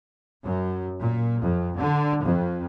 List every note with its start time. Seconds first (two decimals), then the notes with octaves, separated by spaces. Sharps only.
0.44 F#2
1.00 A#2
1.41 F2
1.77 D3
2.24 F2